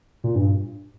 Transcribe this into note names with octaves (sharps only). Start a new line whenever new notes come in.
A#2
G2